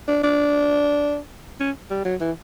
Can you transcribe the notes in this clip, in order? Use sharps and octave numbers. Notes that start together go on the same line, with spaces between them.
D4
D4
C#4
G3
F#3
E3